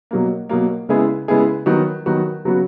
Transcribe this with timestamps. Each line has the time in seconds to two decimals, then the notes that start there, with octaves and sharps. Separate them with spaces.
0.11 B2 F#3 A#3
0.49 B2 F#3 A#3
0.89 C#3 G#3 B3 E4 G#4
1.28 C#3 G#3 B3 E4 G#4
1.66 D#3 F#3 B3 F#4
2.06 D#3 F#3 B3 F#4
2.45 C#3 F#3 B3 F#4